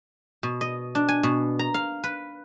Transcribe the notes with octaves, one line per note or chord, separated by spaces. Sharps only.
B2
D#5
D4
G#5
B2
A#5
F5
B4